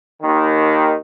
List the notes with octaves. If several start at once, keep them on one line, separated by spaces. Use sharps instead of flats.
D#2 D#3